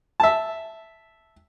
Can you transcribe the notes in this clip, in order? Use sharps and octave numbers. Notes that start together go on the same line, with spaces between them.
E5 A5